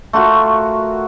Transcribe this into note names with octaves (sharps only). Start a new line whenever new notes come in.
A3 F4 F#4 A#4